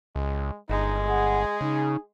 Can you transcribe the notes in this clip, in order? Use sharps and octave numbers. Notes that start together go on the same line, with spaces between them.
C#2 G#3
G1 G#3 D#4
G#4 F#5
C#3 D#4